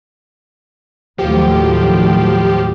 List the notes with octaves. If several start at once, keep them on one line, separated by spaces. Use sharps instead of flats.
D#2 A2 F3 F#3 G4